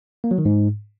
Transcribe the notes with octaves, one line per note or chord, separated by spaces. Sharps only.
A#3
F#3
D#3
G#2